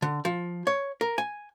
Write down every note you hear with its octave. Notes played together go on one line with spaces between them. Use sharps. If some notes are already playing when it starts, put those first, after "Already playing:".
D3
F3
C#5
A#4
G#5